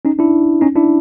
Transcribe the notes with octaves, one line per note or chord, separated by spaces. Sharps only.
C#4 D#4
D4 E4
C#4 D#4
D4 E4